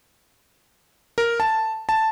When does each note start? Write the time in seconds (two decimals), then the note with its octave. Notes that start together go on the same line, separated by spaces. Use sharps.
1.18 A#4
1.40 A5
1.89 A5